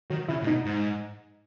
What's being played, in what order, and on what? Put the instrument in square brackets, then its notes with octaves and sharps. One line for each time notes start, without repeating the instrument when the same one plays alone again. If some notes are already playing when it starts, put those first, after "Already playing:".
[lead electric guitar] D#3 [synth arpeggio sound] F#3
[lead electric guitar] C#3 [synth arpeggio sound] E4
[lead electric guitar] A2
[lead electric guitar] B2 [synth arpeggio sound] D#4
[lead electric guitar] G#2